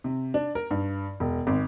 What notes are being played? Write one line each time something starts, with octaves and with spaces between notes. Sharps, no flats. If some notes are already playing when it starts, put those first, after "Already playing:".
C3
D4
A#4
G2
E1
G#1